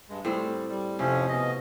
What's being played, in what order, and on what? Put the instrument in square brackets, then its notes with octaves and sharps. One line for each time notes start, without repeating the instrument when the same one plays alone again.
[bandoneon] G2 G#3
[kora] A2 C4 [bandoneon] G3
[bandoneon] G3
[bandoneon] F2 F3 C#4 [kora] C3
[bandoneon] B2 D#5